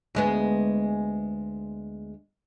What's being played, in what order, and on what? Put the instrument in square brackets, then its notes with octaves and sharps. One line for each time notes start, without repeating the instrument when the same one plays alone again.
[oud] D2 G#3 B3